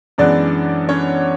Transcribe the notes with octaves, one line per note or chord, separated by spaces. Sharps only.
F#2 E3 G#3 B3 D4 D5
C#4 C#5